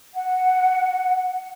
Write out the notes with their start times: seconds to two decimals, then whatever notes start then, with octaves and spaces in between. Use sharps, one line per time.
0.15 F#5